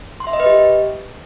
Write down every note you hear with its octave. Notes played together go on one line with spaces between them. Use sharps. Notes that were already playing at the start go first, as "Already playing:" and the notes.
C6
E5
D#5
B4
G4